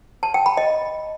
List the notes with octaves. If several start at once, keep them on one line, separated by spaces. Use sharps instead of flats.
A5
G5
B5
D#5